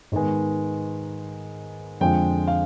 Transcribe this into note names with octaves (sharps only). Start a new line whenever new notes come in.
G#2 D#3 G#3 B3
F2 D3 F3 G#3 G5
F5